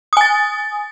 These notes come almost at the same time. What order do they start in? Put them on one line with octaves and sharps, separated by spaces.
D#6 G#5 A6